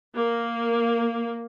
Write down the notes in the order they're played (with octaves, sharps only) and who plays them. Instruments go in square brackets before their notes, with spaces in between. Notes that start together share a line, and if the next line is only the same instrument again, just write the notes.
[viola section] A#3